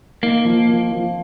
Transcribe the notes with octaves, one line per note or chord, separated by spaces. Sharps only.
A#3 D#4
F3
F3
F3